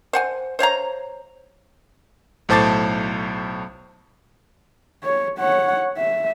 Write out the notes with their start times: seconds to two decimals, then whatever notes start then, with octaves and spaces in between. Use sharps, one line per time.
0.13 C5 F#5 G#5
0.59 C5 C#5 F5 A#5
2.49 B1 A2 C5 A5 D6 A6
5.03 C#5
5.39 C#5 F#5
5.97 E5